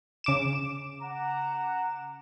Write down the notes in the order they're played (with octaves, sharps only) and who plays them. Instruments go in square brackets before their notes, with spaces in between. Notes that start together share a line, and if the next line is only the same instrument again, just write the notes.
[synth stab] C#3 D6 E7
[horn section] F#5 A#5